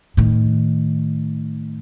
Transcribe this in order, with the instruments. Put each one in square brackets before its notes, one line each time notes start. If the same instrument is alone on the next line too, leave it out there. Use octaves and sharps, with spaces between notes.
[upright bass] A2 D#3